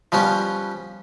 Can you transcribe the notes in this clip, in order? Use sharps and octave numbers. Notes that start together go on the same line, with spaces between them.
F3 G3 B3 C#4